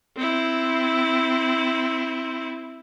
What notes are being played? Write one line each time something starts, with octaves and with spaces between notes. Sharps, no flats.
C4 E4